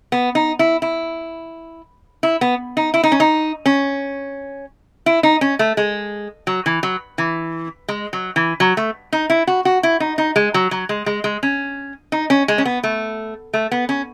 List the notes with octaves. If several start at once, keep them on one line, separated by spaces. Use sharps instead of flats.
B3
D#4
E4
E4
E4
B3
D#4
E4
D#4
C#4
D#4
C#4
E4
D#4
C#4
A3
G#3
F#3
E3
F#3
E3
G#3
F#3
E3
F#3
A3
D#4
E4
F#4
F#4
E4
D#4
D#4
G#3
F#3
F#3
G#3
G#3
G#3
C#4
D#4
C#4
G#3
C#4
B3
A3
A3
B3
C#4